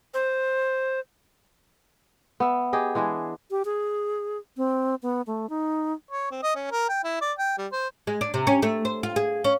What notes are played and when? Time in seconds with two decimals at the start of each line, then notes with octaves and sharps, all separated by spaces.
0.14 C5
2.40 B3 E5
2.73 G4 G#4 D#5
2.95 E3 G#3 D4 G#4
3.51 G4
3.65 G#4
4.57 C4
5.03 B3
5.27 A3
5.49 D#4
6.11 C#5
6.31 C4
6.43 D#5
6.55 C#4
6.71 A#4
6.89 G5
7.04 E4
7.21 D5
7.38 G5
7.58 G3
7.72 C5
8.07 G#3
8.21 D4
8.34 C3
8.47 C#4
8.62 A3
8.85 C5
9.03 F4
9.16 G#4
9.44 C#4